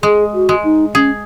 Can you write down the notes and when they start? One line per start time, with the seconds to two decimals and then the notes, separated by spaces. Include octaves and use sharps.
0.03 G#3 G#4
0.34 F#4
0.49 G#3
0.64 D#4
0.94 C#4 G#4